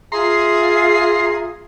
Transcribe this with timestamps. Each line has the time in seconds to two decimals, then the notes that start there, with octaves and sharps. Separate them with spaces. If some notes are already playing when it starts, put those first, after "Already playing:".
0.12 F4 G#4 E5 A#5 C6 C7